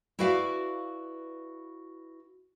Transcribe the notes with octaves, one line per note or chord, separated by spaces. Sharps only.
E4 F#4 B4 D5 E5 F5